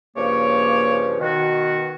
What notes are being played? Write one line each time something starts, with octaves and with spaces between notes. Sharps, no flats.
G2 C#3 F3 A#3 C#5 D6
B2 D#3 F#4